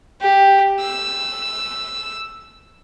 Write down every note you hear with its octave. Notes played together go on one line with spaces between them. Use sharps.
G4
E6